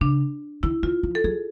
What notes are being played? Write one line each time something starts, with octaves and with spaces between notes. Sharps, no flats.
C#3 D4
D#3 E4
D#3 F4
F3
A4
F#3 G#4